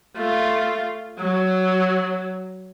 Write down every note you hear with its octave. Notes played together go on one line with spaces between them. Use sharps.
A3 F4
F#3